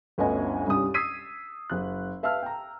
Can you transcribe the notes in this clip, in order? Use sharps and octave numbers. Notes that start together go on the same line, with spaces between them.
G1 D2 B3 C#4 D#5 G#5
C2 G2 C#4 G4 D#6
D#6 E6 G#6 B6 C7 D#7
F#1 F#6
B4 E5 F5 A5 E6 F6
G5 A#5